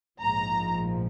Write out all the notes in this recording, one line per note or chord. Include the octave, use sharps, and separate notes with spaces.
A#1 G#2 F3 A#5